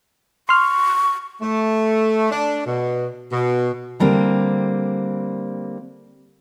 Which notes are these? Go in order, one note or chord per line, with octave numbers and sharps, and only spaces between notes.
C6 C#6 F6
A3
D4
B2
B2
D3 G3 A#3 C4